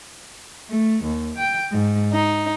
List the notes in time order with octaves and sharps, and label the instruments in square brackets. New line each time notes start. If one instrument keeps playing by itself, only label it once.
[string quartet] A3
D#2
G5
G#2
D#4